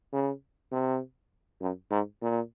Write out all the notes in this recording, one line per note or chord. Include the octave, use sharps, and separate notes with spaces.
C#3
C3
F#2
G#2
A#2